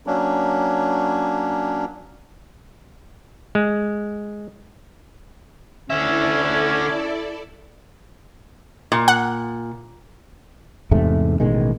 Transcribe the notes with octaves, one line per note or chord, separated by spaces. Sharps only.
F#3 A#3 C#4 D4
G#3
D3 C#4 E4 A4 D5 E5
A#2
F#5
E2 G#2 C3 A3
A1 B2 D#3 G#3